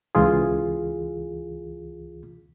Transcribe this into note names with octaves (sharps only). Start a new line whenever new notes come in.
C#2 E3 F4 G#4